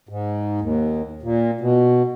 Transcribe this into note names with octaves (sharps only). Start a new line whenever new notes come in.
G#2
D#2
A#2
B2